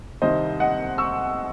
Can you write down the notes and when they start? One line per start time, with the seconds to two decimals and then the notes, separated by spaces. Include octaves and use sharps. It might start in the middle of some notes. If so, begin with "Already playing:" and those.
0.22 C2 C3 D#3 C5 D#5
0.60 D#5 F#5
0.98 C#6 E6